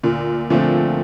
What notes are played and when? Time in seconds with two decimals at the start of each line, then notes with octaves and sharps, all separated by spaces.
0.03 D2 A#2
0.50 A#2 D3 F3 A3 C4